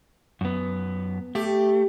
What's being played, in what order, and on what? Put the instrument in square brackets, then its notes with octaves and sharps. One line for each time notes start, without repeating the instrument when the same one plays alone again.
[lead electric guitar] F#2 B3
[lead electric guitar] A3 [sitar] G4